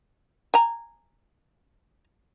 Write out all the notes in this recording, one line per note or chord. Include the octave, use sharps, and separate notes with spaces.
G#5 A#5